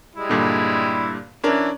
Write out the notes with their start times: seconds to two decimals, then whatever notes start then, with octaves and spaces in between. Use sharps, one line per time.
0.15 G3 G#3 E4
0.29 G2 A#2 D3
1.44 E3 C#4 D4 A#4